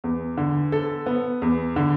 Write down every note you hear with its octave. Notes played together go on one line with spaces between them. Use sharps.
E2
D3
A4
B3
E2
D3